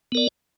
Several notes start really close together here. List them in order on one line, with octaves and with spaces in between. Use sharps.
B3 A#4 D5